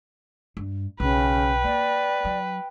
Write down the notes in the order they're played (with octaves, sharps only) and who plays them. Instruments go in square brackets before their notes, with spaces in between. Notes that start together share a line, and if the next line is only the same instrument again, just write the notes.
[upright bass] G2
[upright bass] B1 [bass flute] C#3 [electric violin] B4 [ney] G5
[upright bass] A#3 [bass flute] D5
[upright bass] F#3